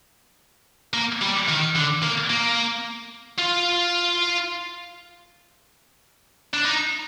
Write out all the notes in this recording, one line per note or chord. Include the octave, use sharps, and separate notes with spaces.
A#3
G3
D#3
D3
A#3
A#3
F4
D4
D#4